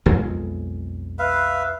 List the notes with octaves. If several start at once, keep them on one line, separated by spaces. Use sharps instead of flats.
B1 F2 G#3
B4 E5 F5